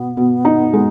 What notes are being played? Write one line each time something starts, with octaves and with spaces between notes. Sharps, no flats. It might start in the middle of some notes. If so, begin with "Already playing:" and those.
Already playing: B2 B3
B2
D#4
G#3